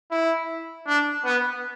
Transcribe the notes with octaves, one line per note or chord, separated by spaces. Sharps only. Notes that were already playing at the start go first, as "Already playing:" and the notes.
E4
D4
B3